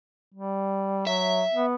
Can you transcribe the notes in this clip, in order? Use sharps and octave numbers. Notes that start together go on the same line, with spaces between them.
G3
F#3 E5
B3